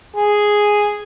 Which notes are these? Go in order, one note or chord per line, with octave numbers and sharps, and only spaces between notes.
G#4